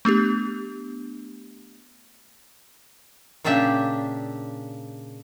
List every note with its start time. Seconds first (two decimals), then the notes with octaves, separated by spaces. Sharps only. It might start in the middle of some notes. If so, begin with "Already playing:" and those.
0.05 A3 B3 D4 G4
3.44 A#2 C#3 D4 G4 E5